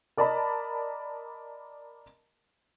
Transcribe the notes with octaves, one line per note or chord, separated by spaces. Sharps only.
A#4 D5 D#5 A5 B5